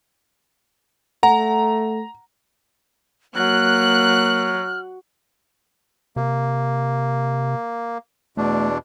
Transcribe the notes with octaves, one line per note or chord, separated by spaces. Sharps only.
A3 F#5 A#5
F#3 A#3 F6 F#6
C3 A#3
E2 B2 A3 D4